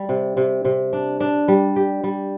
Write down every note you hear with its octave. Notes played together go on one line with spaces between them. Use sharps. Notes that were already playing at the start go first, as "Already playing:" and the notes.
Already playing: G3
C3
C3
C3
D4
D4
G3
G4
G3